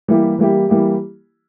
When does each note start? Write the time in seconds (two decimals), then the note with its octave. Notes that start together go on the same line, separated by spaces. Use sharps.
0.08 E3 G3 A#3 E4 G4
0.39 E3 G3 A#3 E4 G4
0.69 E3 G3 A#3 E4 G4